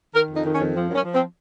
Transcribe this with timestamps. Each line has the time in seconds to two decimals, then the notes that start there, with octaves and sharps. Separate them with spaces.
0.14 D#3 A#4
0.29 F2
0.35 D#4
0.45 D#3
0.55 C#4
0.59 F2
0.74 F3 C4
0.89 F#2
0.95 C#4
1.04 F3
1.14 C4